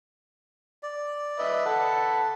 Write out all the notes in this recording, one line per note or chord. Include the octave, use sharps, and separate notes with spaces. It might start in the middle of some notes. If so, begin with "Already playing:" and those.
D5
B4 D#5 E5
A4 B4 F#5